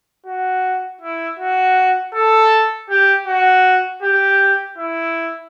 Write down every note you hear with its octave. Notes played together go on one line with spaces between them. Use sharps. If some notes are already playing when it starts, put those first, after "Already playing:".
F#4
E4
F#4
A4
G4
F#4
G4
E4